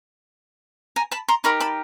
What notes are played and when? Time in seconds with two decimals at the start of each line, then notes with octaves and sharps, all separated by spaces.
0.96 G#5 A#5
1.11 A5 B5
1.28 A#5 C6
1.44 D#4 G4 A#4 B5 C#6
1.60 A5 B5